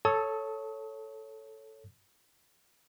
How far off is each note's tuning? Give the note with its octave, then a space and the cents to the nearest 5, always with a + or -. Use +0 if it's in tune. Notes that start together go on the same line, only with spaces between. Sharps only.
A4 +0 C#5 +0 D#6 +40